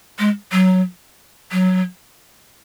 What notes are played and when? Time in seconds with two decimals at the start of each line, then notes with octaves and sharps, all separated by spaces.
0.19 G#3
0.52 F#3
1.52 F#3